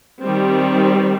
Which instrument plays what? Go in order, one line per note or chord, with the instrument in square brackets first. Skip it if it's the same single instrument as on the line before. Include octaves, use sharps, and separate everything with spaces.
[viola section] D#3 G3 C4